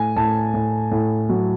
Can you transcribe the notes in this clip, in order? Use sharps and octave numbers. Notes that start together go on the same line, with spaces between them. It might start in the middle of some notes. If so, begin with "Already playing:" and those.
Already playing: A2 G#5
A2 A5
A2
A2
F#3